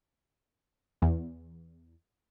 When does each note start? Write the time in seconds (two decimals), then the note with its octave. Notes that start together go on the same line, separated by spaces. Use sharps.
1.02 E2